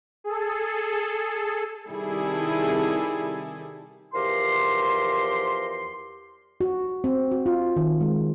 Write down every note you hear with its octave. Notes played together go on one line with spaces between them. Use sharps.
G#4 A4
C3 D#3 G3 E4 G#4 A4
E2 F3 G4 A#4 C6
F#4
C4
F#4
F4
D#3
G#3